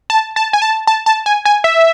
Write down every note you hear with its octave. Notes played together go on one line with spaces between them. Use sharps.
A5
A5
G#5
A5
A5
A5
G#5
G#5
E5